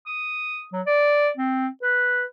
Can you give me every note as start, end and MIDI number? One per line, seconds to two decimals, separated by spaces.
0.06 0.65 87
0.73 0.81 54
0.86 1.30 74
1.37 1.67 60
1.83 2.25 71